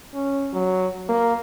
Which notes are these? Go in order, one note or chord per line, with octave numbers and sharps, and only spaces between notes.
C#4
F#3
A#3